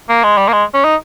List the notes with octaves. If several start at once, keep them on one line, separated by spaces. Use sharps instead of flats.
A#3
G#3
G3
A#3
G#3
C#4
D#4